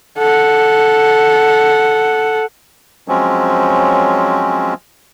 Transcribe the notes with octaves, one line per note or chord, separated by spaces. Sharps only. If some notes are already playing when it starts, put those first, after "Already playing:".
A4 F#5
F3 F#3 G#3 C4 C#4